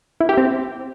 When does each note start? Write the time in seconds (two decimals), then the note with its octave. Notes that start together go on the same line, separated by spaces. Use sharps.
0.20 E4
0.29 G4
0.37 C4